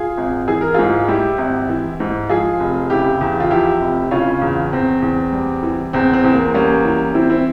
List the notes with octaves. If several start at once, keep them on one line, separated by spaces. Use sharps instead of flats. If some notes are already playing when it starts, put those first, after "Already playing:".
Already playing: F4 G#4
G#1
E3 G#4
A#4
G#2 F4 G#4
G3 E4 G4
G#1
E3
G#2
F3 F4 G#4
F1
C#3 E4 G4
E2
F4
F3 E4 G4
F1
C#3 C#4 F4
E2
E2 C4
E2
G3
E3
E2 C4
C4
E2
A#3
G3 A#3 C#4
E3
E3 C4 E4
C4 E4